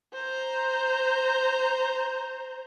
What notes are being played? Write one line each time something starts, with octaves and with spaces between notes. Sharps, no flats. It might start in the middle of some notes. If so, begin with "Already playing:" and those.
C5 A#5